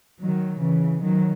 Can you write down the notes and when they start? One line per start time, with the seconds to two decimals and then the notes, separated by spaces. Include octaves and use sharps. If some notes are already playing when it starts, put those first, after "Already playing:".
0.21 D#3 F#3
0.62 C#3 E3
1.03 D#3 F#3